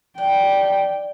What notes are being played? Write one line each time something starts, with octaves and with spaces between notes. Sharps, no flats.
D4 G5